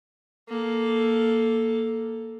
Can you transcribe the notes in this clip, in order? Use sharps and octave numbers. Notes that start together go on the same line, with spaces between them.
A#3 A4